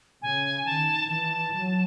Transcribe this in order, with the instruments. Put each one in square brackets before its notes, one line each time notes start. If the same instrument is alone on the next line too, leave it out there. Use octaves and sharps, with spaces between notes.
[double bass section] C#3 [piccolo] G#5
[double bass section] D#3 [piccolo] A5
[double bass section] E3 [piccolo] A5
[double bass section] F#3